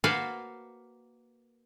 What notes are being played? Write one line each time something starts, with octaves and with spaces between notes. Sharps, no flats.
A#3 F#4 B4 C5 F5 A5